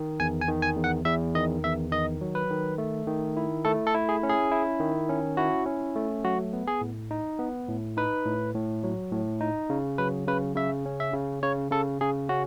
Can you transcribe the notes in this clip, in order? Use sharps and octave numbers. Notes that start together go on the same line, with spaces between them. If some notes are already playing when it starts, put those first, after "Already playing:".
Already playing: D#3
E2 G#5
G#5
D#3
G#5
E2
F#5
E2 E5
D#3 D#5
E2 E5
D#3 D#5
F#3
B4
D#3
A3
D#3
E4
A3 A4
A4
E4
G#4
C#4
G#4
E4
D#3
C#4
E4 F#4
C#4
A3
F#3 F#4
B3
G#4
A2
D#4
B3
A2
D#4 B4
A2
A2
F#3
A2
D#4
C#3
F#3 B4
C#3 B4
C#3 E5
C#4
E5
C#3
C#3 C#5
C#3 A4
C#3 G#4
C#4 F#4